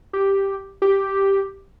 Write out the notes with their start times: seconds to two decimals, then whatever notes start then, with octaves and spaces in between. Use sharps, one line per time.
0.13 G4
0.82 G4